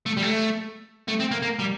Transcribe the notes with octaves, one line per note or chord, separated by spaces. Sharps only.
A3
G3
A3
A3
C4
A#3
A#3
G3